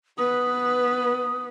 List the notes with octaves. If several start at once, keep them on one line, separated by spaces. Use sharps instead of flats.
B3 B4 D#6